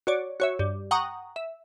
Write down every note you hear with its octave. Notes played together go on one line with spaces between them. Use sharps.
F#4 C#5 D5
F#4 C#5 E5
G2
F#5 G5 A#5 C#6 D#6
E5